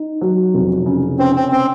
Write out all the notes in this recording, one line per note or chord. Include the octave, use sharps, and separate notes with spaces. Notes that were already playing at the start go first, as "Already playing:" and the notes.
Already playing: D#4
F#3
F1
C#3
C4 C#4
C4
C4 C#4